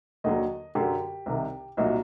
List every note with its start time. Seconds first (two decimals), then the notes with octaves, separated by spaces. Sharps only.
0.24 D#2 D3 F#3 D#5
0.75 F#2 D3 F#3 G4
1.26 C2 C3 D#3
1.77 C2 A#2 F#3 D#4